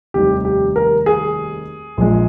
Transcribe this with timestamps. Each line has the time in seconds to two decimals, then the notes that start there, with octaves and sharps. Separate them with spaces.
0.14 F1 D#2 D#3 G3 G4
0.45 G4
0.76 A#4
1.06 G#4
1.97 A#1 A#2 F3 G#3